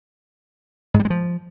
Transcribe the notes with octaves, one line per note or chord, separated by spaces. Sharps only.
G#2
G3
G#3
F3